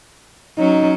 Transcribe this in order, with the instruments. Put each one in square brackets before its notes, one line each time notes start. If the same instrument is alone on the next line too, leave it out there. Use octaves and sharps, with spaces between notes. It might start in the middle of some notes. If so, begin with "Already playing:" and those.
[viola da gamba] F#3 C#4 [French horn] D#4